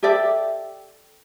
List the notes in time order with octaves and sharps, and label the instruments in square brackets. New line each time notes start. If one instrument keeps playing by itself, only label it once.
[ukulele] G4 A4 D5 E5